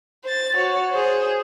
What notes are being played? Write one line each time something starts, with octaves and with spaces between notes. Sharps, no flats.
C5 A6
F#4 C#5
G#4 C5